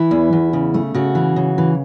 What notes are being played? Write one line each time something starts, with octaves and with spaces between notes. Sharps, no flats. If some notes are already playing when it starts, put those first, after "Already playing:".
Already playing: E3 E4
E2
E2
C#3
A3
C#3 F#4
E3
C#3
E3